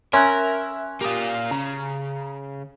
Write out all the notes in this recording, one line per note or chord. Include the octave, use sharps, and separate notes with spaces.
C#4 A#4 E5 C6 E6 F#6 G#6
A#3 F4 G4 D#6
C#3 A#5